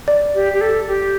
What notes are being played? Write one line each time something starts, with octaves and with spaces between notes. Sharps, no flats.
D5
G4
G4
A4
G4